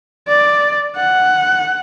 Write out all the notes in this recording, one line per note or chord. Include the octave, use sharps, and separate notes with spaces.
D5
F#5